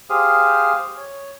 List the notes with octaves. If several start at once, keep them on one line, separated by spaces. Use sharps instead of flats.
G4 G#4 C5 F5 D#6 F6
C#5